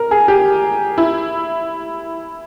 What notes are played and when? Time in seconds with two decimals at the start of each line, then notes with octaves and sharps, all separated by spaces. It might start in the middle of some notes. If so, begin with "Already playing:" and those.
Already playing: A#4
0.11 G#4
0.28 G4
0.98 E4